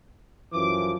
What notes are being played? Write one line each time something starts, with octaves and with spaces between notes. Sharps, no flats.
F#2 E3 F3 D6